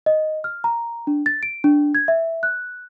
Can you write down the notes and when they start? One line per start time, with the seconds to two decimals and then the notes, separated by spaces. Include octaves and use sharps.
0.06 D#5
0.44 F6
0.64 A#5
1.07 D4
1.26 A6
1.43 D7
1.64 D4
1.95 G#6
2.08 E5
2.43 F#6